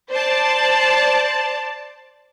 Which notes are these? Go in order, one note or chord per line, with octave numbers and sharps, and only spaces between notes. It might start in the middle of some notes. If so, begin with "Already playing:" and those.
C5 D5 A5